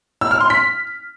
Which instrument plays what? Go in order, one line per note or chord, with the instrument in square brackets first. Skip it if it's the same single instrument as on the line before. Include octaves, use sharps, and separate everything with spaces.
[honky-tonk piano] E6
F6
C6
B6